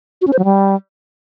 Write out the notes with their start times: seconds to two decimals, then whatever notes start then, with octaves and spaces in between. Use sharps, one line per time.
0.21 F#4
0.27 C#4
0.33 C5
0.39 F#3
0.45 G3